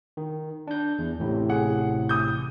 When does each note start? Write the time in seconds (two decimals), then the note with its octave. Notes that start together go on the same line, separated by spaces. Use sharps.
0.17 D#3
0.67 D4 G6
0.99 E2
1.19 A1 A2 C3
1.49 G#4 F#5
2.09 D#6 G6